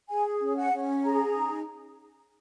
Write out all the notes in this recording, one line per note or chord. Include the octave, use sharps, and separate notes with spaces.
G#4 G#5
C#4
F#5
C#4
G#4 A#5
D#4